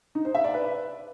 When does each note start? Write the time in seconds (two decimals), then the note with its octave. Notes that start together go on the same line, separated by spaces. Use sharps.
0.15 D#4
0.25 C5
0.34 E5
0.44 D5
0.54 B4